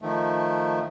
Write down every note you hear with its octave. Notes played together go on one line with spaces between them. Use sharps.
D#3 F3 A3